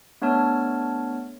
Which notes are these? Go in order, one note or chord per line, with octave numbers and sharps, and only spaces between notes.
A3 B3 D4 C#5 A5 F6